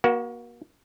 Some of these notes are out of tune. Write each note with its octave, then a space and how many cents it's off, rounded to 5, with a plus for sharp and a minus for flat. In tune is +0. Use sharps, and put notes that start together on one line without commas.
A#3 +35 F#4 +10